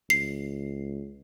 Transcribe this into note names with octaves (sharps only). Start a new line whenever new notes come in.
C#2 C7